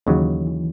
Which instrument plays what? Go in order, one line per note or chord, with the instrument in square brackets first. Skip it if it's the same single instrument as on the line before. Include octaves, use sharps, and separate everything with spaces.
[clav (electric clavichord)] D#2 C#3 F#3 [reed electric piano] E3
[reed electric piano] E3